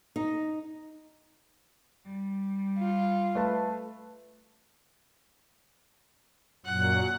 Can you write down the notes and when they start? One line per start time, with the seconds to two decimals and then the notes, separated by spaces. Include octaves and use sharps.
0.16 D#4
2.05 G3
2.79 F4
3.35 A3 B4 A5
6.65 F#2 A#2 F#3 F#5